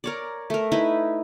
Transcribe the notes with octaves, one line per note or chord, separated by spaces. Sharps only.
A#4 C#5 D5
A3 A#4
D#4 E4 B4